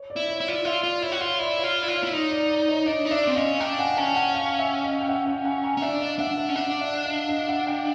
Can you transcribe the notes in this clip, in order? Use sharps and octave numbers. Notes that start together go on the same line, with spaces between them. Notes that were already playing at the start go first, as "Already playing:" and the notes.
Already playing: C#5
D5
E4
C#5
E4
F4 D5
E4
F4 D5 E5
F4 D5
E4 C#5
F#4
F4 C#5
E4 D5
C#5
F4
D5
E4
F4
C#5
E4
D#4 C#5
D5
D5
C#5 D#5
D4 C#5 D#5
D#4
D4 D5 E5
C4
C#4 D#5 F5
D4 F5 G5
F#5 G#5
C#4 G5 A5
F#5 G#5
F5 G5
E5 F#5
D#5 F5
G5
E5 F#5
F5 G5
F#5 G#5
G#5 A#5
C#4
D4 D5 E5
D#5 F5
D4 E5 F#5
E5 F#5
C#4
D4 E5 F#5
D5 E5
D#5 F5
D#5 F5
E5 F#5
F5 G5